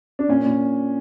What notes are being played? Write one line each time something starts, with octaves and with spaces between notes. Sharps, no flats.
D4
A#2 C#4
A#2